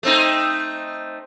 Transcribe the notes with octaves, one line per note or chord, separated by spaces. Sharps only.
A3 C4 D#4